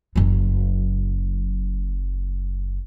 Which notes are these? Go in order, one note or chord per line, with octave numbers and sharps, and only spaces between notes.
F#1 F#3